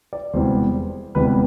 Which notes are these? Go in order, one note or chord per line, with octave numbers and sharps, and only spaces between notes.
D5
E1 E2 C3 G3 C5
E1 E2 C3 G3 B4